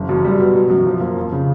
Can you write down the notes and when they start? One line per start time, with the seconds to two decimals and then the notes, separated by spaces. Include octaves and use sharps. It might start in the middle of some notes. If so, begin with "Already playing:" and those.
Already playing: F#1
0.09 F#2
0.24 G3
0.39 B2
0.54 F#3
0.70 F#2
0.86 F3
1.00 A#3
1.16 F2
1.32 C#3